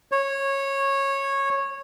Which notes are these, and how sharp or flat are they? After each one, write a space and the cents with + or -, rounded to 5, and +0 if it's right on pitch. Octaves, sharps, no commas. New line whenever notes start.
C#5 -15